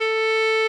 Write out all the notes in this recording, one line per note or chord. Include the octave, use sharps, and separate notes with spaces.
A4